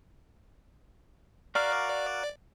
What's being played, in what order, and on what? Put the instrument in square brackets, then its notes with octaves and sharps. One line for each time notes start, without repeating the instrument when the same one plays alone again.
[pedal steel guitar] F#4 A#4 F5 [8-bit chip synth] D5